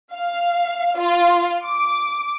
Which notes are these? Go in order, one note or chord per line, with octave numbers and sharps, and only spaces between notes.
F5
F4
D6